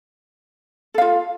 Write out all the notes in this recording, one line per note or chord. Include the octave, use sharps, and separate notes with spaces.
F4 A4 F5